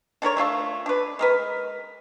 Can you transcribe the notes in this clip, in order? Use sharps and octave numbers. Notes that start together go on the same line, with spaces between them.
D4 A4 A#4 C#5
A3 D4 F4 A4
D4 B4
G#3 A#4 B4